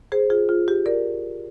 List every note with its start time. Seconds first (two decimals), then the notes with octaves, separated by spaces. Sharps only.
0.12 G#4 C5
0.30 F4 G#4
0.49 F4
0.68 G4
0.86 A#4 D5